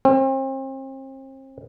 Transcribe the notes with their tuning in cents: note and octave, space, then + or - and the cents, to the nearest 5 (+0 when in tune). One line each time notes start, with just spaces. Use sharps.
C4 +40